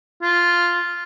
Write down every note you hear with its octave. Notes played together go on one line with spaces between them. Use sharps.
F4